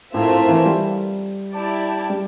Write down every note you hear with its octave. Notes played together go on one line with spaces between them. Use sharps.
A2 A3 C4 F4 A#4 E5
A2
E3
G3
E4 G4 D5 A5
G3